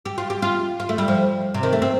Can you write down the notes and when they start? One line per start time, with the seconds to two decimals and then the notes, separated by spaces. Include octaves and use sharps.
0.05 G4
0.18 F4
0.30 G4
0.42 F4
0.80 F4
0.89 A3
0.98 G3
1.08 F3
1.54 C3
1.63 D#3
1.73 A3
1.82 C4